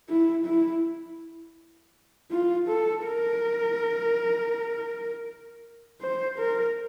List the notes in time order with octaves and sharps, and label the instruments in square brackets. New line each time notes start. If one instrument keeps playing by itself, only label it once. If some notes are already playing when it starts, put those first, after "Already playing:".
[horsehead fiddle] E4
E4
F4
A4
A#4
C5
A#4